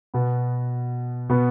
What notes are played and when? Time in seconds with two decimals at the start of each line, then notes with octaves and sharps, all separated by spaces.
0.14 B2 B3
1.29 B2 B3